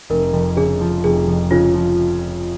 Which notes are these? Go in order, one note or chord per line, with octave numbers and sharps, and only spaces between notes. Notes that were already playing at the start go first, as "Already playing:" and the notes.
F1 A#4
F2
C#3 G#4
F3
F1 G#4
F2
C#3 F4
F3